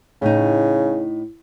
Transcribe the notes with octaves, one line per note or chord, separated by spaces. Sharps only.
A2 C#3 D#4